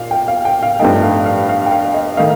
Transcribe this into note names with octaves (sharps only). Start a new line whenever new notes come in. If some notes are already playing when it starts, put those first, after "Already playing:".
Already playing: A#2 F5
G5
F5
G5
F5
G2 F3 A3 D#4 G5
F5
F5
F5
G5
F5
D#5
D#3 A3 D#4 F5